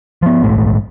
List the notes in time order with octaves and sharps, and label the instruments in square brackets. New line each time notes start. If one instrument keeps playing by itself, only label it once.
[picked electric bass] F3 B3
A#1 G#2 A3